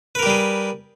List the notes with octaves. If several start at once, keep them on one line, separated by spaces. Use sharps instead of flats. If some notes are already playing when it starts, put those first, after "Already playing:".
G3 G4 G#4 A#4 B4